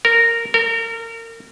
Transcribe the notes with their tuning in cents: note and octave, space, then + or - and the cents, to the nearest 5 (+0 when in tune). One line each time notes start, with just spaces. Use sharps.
A#4 -10
A#4 -30